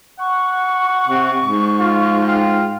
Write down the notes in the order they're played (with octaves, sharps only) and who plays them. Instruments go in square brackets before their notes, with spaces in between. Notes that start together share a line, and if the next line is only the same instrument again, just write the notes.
[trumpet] F#5 [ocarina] C#6
[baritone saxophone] C3
G#2
[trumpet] F4
[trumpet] F4 [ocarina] G5